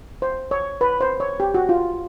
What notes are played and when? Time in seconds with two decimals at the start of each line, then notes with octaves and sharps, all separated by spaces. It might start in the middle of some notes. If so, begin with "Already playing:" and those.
0.22 C5
0.51 C#5
0.81 B4
1.01 C5
1.20 C#5
1.40 G4
1.54 F#4
1.69 F4